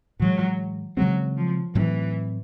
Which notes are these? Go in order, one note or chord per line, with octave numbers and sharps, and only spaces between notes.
A2 E3 F#3 G#3
C#3 E3 F#3 G#3 C4
F3
A2 E3 F#3 A3 C4